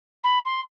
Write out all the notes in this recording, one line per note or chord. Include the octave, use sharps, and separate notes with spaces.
B5
C6